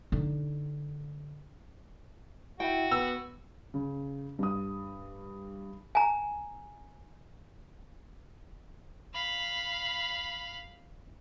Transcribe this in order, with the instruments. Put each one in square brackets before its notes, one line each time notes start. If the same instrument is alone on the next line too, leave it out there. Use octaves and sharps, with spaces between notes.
[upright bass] D3 D#4
[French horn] E4 [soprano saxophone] F#4 [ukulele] G5
[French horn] B3 [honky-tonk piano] E6
[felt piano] C#3
G2 D#6
[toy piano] G#5 A#5
[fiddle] F5 B5